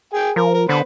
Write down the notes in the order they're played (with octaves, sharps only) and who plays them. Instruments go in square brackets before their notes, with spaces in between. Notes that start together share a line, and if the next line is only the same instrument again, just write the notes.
[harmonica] G#4 G5
[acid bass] F3 [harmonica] A#4
[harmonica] A#4
[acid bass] D3 [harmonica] B3 B4 C5